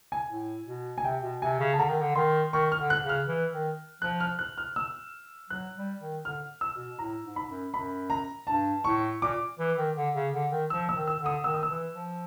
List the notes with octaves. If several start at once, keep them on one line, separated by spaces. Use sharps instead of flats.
G#5
A2
B2
G#5
C3 G5
B2
C3 G#5
C#3
A5
D3 A#5
D#3
D3
D#3 C6
D#3 C#6
F6
D3
F#6
C#3
F6
E3
D#3
F3 F#6
F6
F#6
F6
E6
F#3 F#6
G3
D#3
D3 F6
E6
B2
A2 A#5
G#2
B5
F#2
F#2 B5
A#5
G2 A5
A2 C#6
A#2 D6
E3
D#3
D3
C#3
D3
D#3
F3 E6
E6
D#3
E6
D3
D#6
D#3 E6
D#6
E6
E3
F3